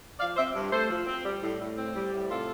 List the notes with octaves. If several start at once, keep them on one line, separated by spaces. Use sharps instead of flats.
F3 D5 F5
C4 C5 E5
G2
A3 A4 C5
F3
C4
G3
A2
A2
C4
G3
A2
C3 F4 A4